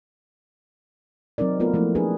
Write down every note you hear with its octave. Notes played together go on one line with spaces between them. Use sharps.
F#3 C4 D#4 A#4 D5
A3 B3 F4 A#4 B4
F3 A3 A#3 E4
D4 G#4 B4